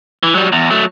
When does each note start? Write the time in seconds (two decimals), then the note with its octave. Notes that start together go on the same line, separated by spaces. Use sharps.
0.23 E3
0.35 F#3 G3
0.52 E2
0.71 F#3 A3